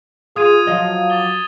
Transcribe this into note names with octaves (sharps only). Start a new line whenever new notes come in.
F4 G#4 D#6 G#6 D#7
F3 F#3 D#5
D6 A6 G7